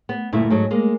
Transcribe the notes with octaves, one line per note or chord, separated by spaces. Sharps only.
B3
D2 G2 A#2 A3 E4
G#2 F#3 A4
G#3 A#3